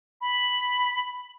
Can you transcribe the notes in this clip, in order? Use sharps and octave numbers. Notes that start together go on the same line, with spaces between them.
B5